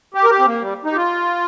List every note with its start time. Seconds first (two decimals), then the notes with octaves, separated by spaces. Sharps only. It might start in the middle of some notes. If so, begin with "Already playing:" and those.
0.14 G4
0.24 A#4
0.30 G4
0.39 C4
0.46 A#3
0.61 G3
0.85 D#4
0.92 G4
0.96 F4